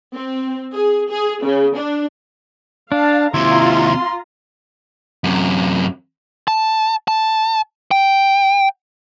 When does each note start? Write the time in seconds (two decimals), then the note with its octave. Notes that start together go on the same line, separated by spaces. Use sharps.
0.14 C4
0.74 G#4
1.10 G#4
1.44 C#3
1.76 D4
2.92 D4 F5 A5
3.34 D#2 C3 E4 F4 A#5 C6
5.24 F#2 C3
6.48 A5
7.08 A5
7.91 G5